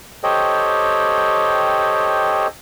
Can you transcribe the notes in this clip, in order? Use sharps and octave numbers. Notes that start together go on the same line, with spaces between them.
G4 A4 C5 C#5 D#5 G5